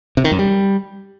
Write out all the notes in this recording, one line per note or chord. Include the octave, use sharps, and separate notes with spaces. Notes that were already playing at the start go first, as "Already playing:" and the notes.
C3
D#3
F#2
G3